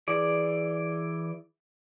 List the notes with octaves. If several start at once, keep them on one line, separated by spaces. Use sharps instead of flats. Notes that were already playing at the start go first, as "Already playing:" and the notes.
E3 G#4 D5